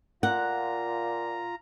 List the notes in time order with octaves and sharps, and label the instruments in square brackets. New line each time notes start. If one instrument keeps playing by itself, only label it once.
[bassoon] A#2 [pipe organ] F4 A#5 [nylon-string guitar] F#5